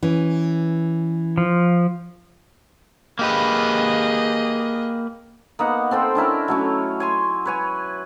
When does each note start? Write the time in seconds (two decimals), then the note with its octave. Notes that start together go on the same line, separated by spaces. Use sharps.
0.03 E3 C#4
1.38 F3
3.19 A#3 G4 G#4 B4 D#5
5.59 A#3 B3 D#4 F#5
5.91 C4 A4 C5 G5
6.15 C#4 D4 E4 A#4
6.48 F#3 A3 C#4
7.00 C#5 G#5 C6
7.45 B4 C#5 G#5